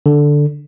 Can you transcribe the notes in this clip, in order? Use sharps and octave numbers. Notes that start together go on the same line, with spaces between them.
D3